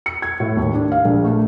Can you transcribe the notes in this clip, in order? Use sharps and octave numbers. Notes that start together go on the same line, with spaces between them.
C#7
G#6
A2
D#2
D4
F5
A#1
A3